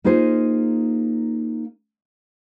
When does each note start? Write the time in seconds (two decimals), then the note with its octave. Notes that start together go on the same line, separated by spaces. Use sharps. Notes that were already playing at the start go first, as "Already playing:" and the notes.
0.04 A#3 D#4 F4 G#4 C5